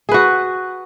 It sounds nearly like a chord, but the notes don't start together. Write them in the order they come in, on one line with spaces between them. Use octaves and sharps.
G#4 B4 F#4